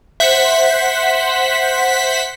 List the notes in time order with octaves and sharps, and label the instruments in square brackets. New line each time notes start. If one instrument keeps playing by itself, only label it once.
[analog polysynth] C5 F#5 B6 [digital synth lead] E5